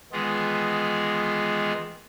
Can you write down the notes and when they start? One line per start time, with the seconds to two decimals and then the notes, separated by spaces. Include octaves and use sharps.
0.12 D#3 E3 G#3 B3 F4 G#4